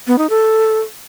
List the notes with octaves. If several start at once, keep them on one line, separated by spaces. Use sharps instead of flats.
B3
D#4
A4